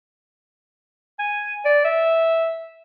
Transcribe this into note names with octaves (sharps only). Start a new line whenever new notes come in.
G#5
D5
E5